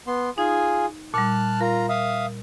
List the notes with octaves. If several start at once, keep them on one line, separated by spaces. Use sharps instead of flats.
B3 C6
D#4 F4 G#4 G#5
A#2 G3 A5 F6 F#6
F4 A#4 A#5
E5 F5 D#6